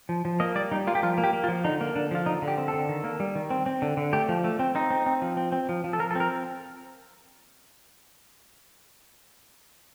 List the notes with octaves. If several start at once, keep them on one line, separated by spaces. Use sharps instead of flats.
F3
F3
A#3 D#5
G3 D5
G3 D#4
A#3 F4
G4
F3 F4
A#3
G4
A#3
F4
F3
D3 D#4
A#3
D3 D4
F3 F4
D3 D#4
D3
G4
C4
A4
D3
D#3
A#3
G3
D#3
C4
C4
D3
D3
A3 G4
F3
A3
C4
C4 D#4
C4
C4
F3
C4
C4
F3
F3
A4
F3 A#4
A4
C4 A#4